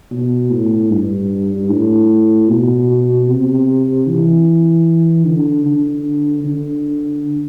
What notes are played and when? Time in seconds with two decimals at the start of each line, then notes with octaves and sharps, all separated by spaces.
0.11 B2
0.50 A2
0.91 G2
1.69 A2
2.49 B2
3.28 C3
4.07 E3
5.26 D3
5.66 D3
6.44 D3